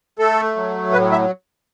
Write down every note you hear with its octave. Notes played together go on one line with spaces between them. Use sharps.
A3 A4
F#3
A2 B4
E5